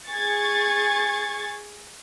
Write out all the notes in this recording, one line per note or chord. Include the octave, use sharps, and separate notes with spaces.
G#4 C#6 G#6 A6